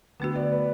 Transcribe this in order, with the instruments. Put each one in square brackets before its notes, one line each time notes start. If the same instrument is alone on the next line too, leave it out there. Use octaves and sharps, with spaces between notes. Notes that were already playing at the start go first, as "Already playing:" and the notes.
[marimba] D3 A3 D4 F#4 [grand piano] B3
[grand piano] D5
B4